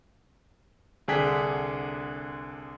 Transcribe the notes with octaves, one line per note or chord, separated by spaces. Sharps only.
C2 D3 D4 G#4 G5 B6